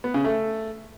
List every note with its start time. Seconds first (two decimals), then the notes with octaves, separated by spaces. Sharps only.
0.04 B3
0.14 C#3
0.24 A3